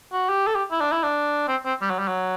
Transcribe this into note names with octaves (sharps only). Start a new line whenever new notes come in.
F#4
G4
A4
G4
E4
D4
E4
D4
C4
C4
G3
F#3
G3
F#3